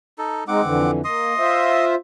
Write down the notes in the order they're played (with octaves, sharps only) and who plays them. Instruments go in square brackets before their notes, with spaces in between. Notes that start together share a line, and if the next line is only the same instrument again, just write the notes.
[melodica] D#4 A4
[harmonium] G#3 D#4 [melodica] C4 F#5 D6
[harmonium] F2 D3 E3
[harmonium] A#3 [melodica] D#5 C6 D#6
[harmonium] F4 C5 E5